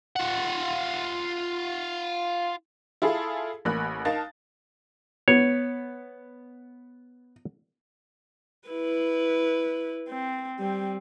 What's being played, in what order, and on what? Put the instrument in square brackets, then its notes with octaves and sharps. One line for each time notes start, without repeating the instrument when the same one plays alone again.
[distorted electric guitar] F4 F#5
[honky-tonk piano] E4 F4 G#4 A4 F5
A1 A#3 B5 F#6
D#4 A#4 F5 A5 A6
[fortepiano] B3 [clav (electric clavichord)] C#5
[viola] E4 B4
C4
G3 C4